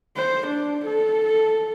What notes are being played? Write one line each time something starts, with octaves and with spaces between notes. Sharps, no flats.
C5
D4
A4